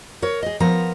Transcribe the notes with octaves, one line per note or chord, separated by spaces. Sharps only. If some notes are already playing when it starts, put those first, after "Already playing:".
A#4 C#5
G#4 D#5
F3 B3 A#4 A#5